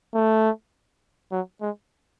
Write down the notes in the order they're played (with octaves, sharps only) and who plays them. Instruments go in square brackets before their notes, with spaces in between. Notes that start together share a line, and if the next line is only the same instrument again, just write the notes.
[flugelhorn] A3
F#3
G#3